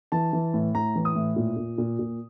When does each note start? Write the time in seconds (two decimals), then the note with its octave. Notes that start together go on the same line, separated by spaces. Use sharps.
0.12 E3 A5
0.33 E3
0.54 A2
0.75 A2 A#5
0.96 E3
1.05 D#6
1.16 A2
1.36 A#2
1.57 A#2
1.78 A#2
1.99 A#2